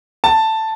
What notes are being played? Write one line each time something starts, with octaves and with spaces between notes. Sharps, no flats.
A5